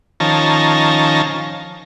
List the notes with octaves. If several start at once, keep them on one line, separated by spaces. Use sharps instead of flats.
D#3 F3 C#4 A5 A#5